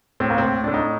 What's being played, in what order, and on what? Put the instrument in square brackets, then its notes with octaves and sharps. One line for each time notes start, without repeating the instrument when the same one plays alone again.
[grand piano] A2 C4
A#3
C4
A2
A2 D4
D#4